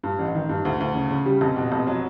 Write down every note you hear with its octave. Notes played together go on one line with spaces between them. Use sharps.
G2
A1
D#3
G2
D2
D2
C#3
C#3
G3
F1
B2
F1
F#3